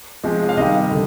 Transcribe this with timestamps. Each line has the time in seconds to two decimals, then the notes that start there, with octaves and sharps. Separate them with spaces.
0.23 C3 F3 G#3
0.49 F5
0.57 C3 D#3 G3 D#5
0.91 D3